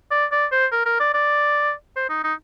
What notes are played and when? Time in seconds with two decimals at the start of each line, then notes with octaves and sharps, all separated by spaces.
0.11 D5
0.32 D5
0.52 C5
0.72 A#4
0.86 A#4
1.00 D5
1.14 D5
1.96 C5
2.10 D#4
2.24 D#4